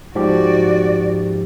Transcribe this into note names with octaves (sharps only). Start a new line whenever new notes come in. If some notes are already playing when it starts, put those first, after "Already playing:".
G#2 F3 F#4 G4 D5